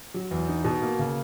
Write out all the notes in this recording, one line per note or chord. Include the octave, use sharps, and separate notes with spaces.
F#3
E2
D#4
B2
A#3
C#3